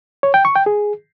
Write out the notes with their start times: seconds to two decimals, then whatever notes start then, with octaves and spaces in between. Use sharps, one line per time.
0.23 C#5
0.34 G5
0.45 C#6
0.56 G5
0.66 G#4